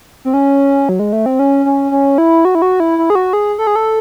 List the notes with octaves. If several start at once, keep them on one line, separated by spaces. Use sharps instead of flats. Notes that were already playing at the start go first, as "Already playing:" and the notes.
C4
C#4
F#3
G#3
A3
C4
C#4
C#4
C#4
E4
F#4
E4
F#4
E4
E4
G#4
F#4
G#4
A4
G#4
A4